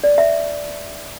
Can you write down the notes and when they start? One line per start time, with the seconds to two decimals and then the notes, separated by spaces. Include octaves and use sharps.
0.04 D5
0.18 E5